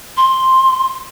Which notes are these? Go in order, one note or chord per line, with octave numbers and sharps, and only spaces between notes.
C6